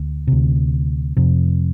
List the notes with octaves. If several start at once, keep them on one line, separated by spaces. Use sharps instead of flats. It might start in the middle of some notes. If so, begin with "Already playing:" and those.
Already playing: D2
D2 C3
F2 C3